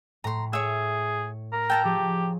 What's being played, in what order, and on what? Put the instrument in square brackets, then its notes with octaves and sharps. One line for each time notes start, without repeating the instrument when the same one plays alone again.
[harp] A2 A3 [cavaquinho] A#5 C6
[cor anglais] G#4 [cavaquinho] C#5 E5
[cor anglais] A#4
[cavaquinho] G5 A5 A#5 [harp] E6 C#7
[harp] F3 G#4 C#5 [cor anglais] G4